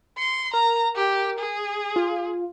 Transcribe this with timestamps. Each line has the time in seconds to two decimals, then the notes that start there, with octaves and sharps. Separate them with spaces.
0.18 C6 C#7
0.54 A#4 A#5
0.95 G4
1.39 G#4
1.96 F4